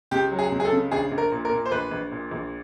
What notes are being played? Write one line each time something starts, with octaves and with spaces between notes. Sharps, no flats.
C#2 G4
F#3
G#4
C#2
G#4
A4
C#3
A#1 G#4
A#1
A#4
A#2
A#4
A#2
C5
A#1 B4
A#1
A#2
A#1